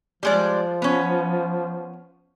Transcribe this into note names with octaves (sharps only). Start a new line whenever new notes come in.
F3 G3 G#3 D5
B3 C#4